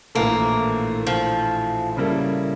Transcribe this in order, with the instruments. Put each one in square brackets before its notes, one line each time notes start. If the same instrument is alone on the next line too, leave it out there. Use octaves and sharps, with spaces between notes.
[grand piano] A#1 A2 E3 A3 [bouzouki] A#3
[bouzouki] F3
[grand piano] C#3 G3 A#3 E4 A4